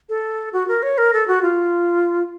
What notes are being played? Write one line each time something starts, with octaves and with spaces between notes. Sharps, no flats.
A4
F#4
A#4
C#5
A#4
A4
F#4
F4